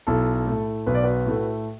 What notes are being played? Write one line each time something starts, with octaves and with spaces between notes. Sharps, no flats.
B1 E4 A4
A2 A3
B1 B4
D5
F#4 B4
A2 A3